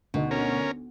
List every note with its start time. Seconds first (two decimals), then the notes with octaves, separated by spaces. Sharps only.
0.14 D2 B2 D#4
0.31 C#4 A#4